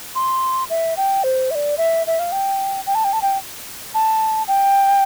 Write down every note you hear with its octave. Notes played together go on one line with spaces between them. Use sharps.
C6
E5
G5
C5
E5
D5
E5
E5
F5
G5
G5
A5
G5
A5
G5
A5
G5